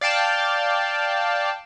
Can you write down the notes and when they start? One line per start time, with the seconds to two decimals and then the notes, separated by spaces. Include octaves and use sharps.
0.01 D5 F5 G5 A5